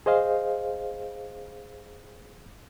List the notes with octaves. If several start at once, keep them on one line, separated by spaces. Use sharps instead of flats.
G#4 C5 D#5 F5